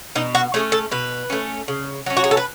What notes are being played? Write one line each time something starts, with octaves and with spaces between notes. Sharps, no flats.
B2 D#4
F#4
A3 C#4 G#4
A4
B2 B4
A3 C#4
C#3
F#3 C#4
F#4
G#4
A4
B4